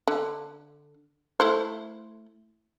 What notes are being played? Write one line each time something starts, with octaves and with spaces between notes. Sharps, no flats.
D3
A3 E4 C5